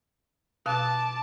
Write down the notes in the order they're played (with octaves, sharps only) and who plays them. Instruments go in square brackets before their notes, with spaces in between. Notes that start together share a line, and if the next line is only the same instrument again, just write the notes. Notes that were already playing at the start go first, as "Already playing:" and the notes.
[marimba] B2 F5 F#6 [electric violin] A5 D6